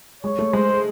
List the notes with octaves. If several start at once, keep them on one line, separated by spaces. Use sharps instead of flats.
G#3 C#5
A3
G#3 C5